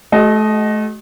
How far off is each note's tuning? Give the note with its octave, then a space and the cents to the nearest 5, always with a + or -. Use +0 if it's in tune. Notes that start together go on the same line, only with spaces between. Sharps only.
A3 -35 F#4 +45 D#5 +0